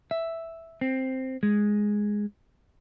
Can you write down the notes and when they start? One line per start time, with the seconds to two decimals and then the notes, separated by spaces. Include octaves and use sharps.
0.11 E5
0.81 C4
1.43 G#3